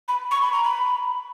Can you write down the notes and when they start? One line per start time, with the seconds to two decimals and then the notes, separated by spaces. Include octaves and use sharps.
0.08 B5
0.31 C#6
0.42 B5
0.52 A#5
0.64 B5